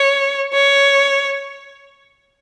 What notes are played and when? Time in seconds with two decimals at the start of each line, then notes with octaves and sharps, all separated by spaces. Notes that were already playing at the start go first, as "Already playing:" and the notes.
Already playing: C#5
0.53 C#5